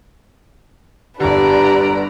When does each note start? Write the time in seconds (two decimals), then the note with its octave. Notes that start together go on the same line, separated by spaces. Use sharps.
1.20 G1 D3 D4 G4 B4 D5 A#5